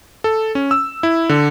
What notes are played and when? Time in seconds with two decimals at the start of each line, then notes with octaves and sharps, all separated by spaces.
0.24 A4
0.55 C#4
0.71 E6
1.03 E4
1.29 D3